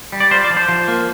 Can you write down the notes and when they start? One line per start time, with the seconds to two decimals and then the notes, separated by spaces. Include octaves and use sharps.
0.12 G3
0.20 D5
0.31 F4 C5
0.44 D5
0.51 F3
0.57 C5
0.69 F3
0.88 A#3